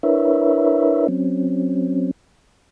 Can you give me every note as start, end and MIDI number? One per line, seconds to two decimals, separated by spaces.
0.03 1.07 62
0.03 1.07 64
0.03 1.07 70
0.03 1.07 71
0.03 1.07 73
0.03 1.07 76
1.08 2.11 54
1.08 2.11 60
1.08 2.11 61